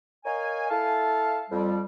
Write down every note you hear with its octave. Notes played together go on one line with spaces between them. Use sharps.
A#4 C#5 D#5 F5 G#5
E4 A4 F5 A5
F2 G3